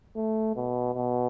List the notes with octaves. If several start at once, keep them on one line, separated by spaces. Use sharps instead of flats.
A3
B2
B2